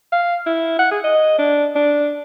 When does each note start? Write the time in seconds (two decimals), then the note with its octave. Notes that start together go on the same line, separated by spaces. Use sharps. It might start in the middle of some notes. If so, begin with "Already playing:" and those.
0.12 F5
0.46 E4
0.79 F#5
0.91 G#4
1.04 D#5
1.38 D4
1.76 D4